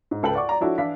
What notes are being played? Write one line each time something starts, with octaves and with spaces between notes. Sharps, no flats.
G#2
C#2 A4 B4 G5 F#7
D5 F#5 C#6 D6
D5 A#5
F3 D4 E4 F#4 A4 C#5
E3 D4 E4 F5 B6